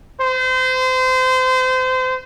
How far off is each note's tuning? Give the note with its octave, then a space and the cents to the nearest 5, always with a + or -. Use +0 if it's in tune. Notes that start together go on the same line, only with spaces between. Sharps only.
C5 -30